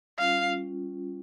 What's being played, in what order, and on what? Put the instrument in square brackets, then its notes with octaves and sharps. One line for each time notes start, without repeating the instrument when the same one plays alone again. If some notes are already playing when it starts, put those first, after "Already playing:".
[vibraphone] G3 C#4 F4 [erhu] F5